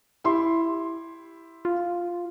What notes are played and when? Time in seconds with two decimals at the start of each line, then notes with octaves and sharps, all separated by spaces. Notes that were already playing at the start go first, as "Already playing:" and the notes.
0.24 E4 G4 C6
1.65 F4